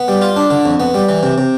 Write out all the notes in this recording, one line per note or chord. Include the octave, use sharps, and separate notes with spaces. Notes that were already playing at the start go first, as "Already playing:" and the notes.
Already playing: B3
G3
F4
D4
D3
F2
B3
G3
E3
C3
C3